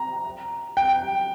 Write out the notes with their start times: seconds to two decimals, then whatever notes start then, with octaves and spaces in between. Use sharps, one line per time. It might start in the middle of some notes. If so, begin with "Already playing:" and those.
Already playing: A#5
0.77 G5